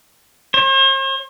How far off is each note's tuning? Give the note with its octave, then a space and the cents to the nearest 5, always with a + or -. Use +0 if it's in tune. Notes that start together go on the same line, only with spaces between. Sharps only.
C5 +45